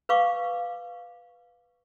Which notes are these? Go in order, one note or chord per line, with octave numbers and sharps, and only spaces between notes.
B4 F5 C#6 D6